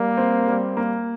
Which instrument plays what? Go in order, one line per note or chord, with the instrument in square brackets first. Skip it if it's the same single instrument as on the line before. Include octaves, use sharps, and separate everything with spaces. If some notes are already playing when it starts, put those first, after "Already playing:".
Already playing: [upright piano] G3 [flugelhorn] A#3
[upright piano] C4
G3
A#3